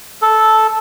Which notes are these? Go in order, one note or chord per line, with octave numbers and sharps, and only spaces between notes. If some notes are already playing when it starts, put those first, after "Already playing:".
A4